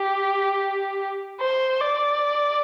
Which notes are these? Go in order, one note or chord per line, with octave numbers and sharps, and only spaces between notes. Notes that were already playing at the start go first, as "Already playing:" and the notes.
Already playing: G4
C5
D5